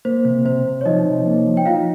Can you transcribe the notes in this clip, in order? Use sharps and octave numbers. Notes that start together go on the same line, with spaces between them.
A#3 C5
C3 C5
C3 C5
C3
C#5
F3 D#4 D#5
C3
A#3
F3
G5
D#4 F4 F5